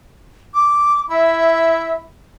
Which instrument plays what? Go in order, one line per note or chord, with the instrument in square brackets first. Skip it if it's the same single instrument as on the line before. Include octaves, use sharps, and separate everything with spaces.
[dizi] D6
[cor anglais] E4 [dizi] E5